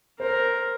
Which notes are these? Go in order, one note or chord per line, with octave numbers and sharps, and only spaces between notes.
A#4 C5